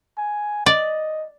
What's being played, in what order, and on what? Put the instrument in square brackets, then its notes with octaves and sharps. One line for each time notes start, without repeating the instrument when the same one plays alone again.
[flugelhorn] G#5
[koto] D5 [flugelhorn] D#5